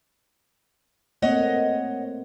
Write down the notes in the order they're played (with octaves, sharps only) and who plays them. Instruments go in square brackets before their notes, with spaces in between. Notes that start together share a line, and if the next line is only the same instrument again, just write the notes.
[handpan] A3 A#3 C4 [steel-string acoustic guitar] C#5 D#5 F#5